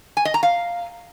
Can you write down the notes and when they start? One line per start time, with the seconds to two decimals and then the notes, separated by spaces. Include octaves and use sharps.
0.17 G#5
0.25 D#5
0.34 A#5
0.43 F5